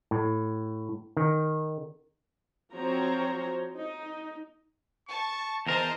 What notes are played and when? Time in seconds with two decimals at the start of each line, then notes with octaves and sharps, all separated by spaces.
0.11 A2
1.17 D#3
2.73 F3 C4 F#4 C5 C#5 A#5
3.75 D#4
5.09 A5 C#6
5.67 E2 A#4 C5 D#5 A5 A#5